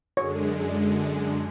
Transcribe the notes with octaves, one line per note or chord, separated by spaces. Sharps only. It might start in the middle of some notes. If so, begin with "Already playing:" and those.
F#2 D3 G#3 C#5